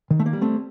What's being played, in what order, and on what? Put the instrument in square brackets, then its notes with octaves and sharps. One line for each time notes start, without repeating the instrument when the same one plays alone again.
[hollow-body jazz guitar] D#3
A3
A#3
G3
A3 C4